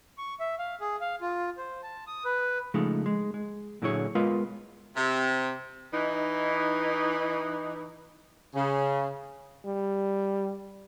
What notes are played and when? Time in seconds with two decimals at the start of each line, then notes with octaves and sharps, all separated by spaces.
0.18 C#6
0.40 E5
0.59 F5
0.81 G#4
1.01 F5
1.21 F4
1.57 C5
1.83 A5
2.07 D#6
2.25 B4
2.74 C#3 F3 G#3 A3 D#4
3.06 G#3
3.34 G#3
3.82 A#2 D3 F#3 E4 G#4 C#5
4.15 G#3 B3 F4 A#4 B4 F5
4.96 C3
5.93 E3 D#4
8.55 C#3
9.65 G3